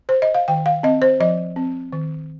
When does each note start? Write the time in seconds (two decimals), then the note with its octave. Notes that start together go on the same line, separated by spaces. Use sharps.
0.09 C5
0.22 D#5
0.34 F5
0.48 D#3 G5
0.66 F5
0.83 C4 D#5
1.02 C5
1.20 F3 D#5
1.56 C4
1.92 D#3